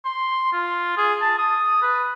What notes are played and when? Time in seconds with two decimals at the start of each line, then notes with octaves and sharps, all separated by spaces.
0.05 C6
0.53 F4
0.97 G#4
1.21 A5
1.38 D#6
1.82 B4